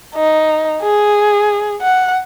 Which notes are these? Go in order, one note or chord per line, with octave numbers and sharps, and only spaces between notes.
D#4
G#4
F#5